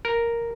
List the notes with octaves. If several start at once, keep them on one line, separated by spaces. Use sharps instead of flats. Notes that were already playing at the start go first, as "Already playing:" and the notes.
A#4